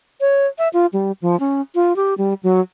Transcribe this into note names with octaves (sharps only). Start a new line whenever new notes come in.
C#5
E5
F4
G3
F3
C#4
F4
G4
G3
F#3